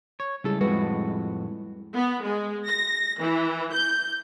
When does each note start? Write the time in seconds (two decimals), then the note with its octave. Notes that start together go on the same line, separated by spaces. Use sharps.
0.20 C#5
0.44 C#2 G3 E4 G#4 A4
0.61 F2 A2 G#3 F#4 B4
1.95 B3
2.23 G#3
2.67 A#6
3.19 E3
3.73 G6